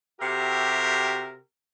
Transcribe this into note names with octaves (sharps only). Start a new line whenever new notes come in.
C3 F#4 G4 A4 A#4 E5